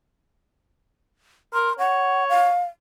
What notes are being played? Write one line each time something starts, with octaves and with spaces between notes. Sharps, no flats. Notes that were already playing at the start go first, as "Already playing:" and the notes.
A#4 C6
C#5 F#5
F5